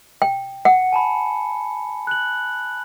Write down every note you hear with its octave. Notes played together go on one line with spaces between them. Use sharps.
G5
F#5 C#7
G#5 A5 B5
F#6 F#7